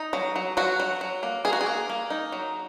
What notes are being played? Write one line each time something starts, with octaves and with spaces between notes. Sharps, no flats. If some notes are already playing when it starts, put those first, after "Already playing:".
Already playing: D#4
F#3
F#3
F#3 F#4
F#3
F#3
A#3
A#3 G#4
F#4
G#4
A#3
A#3
D#4
F#3